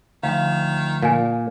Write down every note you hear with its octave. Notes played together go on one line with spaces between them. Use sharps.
D2 D#3 F3 F5
A#2 F5 G#5